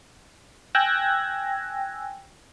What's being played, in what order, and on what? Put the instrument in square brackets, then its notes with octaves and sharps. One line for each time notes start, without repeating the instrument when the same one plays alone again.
[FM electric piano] G5 G#5 E6 F#6 G#6 A#6